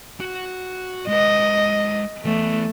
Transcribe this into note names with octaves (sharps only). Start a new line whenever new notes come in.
F#4 F#5
G#3 B4 D#5
E3 A3 B3